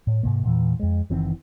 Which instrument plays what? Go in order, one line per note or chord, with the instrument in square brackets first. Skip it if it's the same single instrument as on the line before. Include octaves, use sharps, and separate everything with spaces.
[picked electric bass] A2
G#2 C3 A#3
E2 A#2 E3
F2 G#3
F#1 D#3 E3 C4